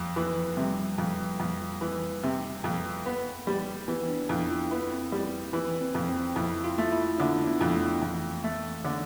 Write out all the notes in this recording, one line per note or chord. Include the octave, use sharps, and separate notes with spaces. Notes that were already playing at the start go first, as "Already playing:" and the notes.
Already playing: F2 F3
E3
C3 G3
F2
F2
E3
C3
F2
B3
G3
E3 B3
D4
F2 E4
F4
B3 E4
C4
G3
E3
C4
F2
C4
F2 E4
F4
A3
E4
D3 D4
B3
F2
A3
F2 E3
A3
D3